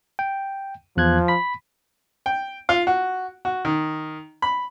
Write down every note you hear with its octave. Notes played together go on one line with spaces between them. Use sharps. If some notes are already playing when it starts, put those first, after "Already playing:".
G5
E2 F3 F#6 G#6
B5 B6
G5
F4
F#4
F#4
D#3
B5